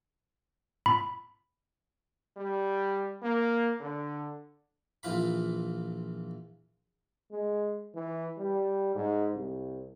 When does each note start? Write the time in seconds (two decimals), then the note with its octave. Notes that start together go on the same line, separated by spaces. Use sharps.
0.86 B5
2.36 G3
3.22 A#3
3.80 D3
5.03 A#1 E3 F4 B5
7.32 G#3
7.95 E3
8.38 G3
8.95 G#2
9.34 C2